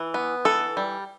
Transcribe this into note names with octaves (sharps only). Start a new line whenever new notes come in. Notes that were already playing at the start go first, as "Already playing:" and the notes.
Already playing: E3
B3
E3 A4
G3